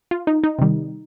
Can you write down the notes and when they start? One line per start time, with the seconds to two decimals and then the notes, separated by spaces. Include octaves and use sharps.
0.11 F4
0.27 D#4
0.44 D#4
0.59 C3 D#3 G3